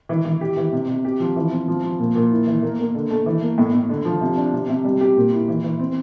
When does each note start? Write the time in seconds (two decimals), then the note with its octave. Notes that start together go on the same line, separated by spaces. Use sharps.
0.09 E3
0.25 E3
0.41 G4
0.57 E3
0.73 C3
0.88 C3
1.05 G4
1.20 F3
1.36 E3
1.52 C4
1.68 F3
1.84 F3
1.99 A#2
2.15 A#2
2.31 E4
2.47 E3
2.63 A#3
2.79 A#3
2.94 D3
3.10 A3
3.26 E3
3.42 A#3
3.58 A2
3.73 A2
3.89 D3
4.05 F3
4.21 C3
4.37 D4
4.53 C3
4.69 C3
4.84 G3
5.01 G4
5.16 A#2
5.32 E4
5.48 E3
5.63 E3
5.79 C4